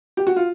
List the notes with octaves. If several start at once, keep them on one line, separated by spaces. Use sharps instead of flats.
G4
F#4
F4